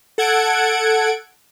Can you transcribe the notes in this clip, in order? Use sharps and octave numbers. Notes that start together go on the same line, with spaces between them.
A4 F#5 G#6 D7